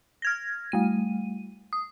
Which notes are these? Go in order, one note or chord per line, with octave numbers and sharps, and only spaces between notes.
F6 G#6 A#6
G3 A3 D#7
D#6